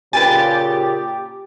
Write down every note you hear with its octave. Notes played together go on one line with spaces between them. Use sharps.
A#2 C#3 G4 B4 G5 G#5 A6